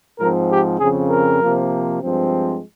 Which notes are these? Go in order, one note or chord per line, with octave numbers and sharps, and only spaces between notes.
G#2 F3 C4 A#4
G4
F2 C#3 F3 C4 G#4
A#4
C3 F3 A#3
G2 F3 G#3 C4